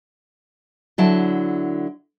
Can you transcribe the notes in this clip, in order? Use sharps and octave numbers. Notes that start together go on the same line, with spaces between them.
D3 F#3 E4 A5